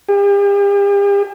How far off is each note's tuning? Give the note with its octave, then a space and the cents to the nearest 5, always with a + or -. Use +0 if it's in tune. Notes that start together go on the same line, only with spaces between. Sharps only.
G4 +45